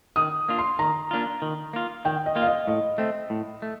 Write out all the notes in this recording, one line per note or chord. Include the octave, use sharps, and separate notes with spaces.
D#3 D#6
A#3 D4 F4
C6
D#3 A#5
A#3 D4 F4
D#3
A#3 F4
D#3 G5
D#5
A#3 F4
F5
D#5
A2 D#5
A3 C4
A2
A3